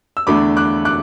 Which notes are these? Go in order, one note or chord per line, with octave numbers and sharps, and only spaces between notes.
E6
E2 D3 A3 D4 B5 D6
D6 F#6
D6 F#6